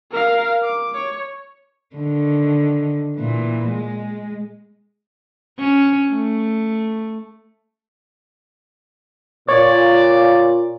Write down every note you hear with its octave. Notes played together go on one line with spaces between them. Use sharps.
A#4 F5
D6
C#5
D3 D#3
A#2 E3
G#3
C#4
A3
A#2 C#5 D5